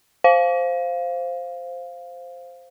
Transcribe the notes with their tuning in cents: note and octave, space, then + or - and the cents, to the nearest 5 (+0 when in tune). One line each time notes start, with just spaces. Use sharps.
C5 +0 F5 +0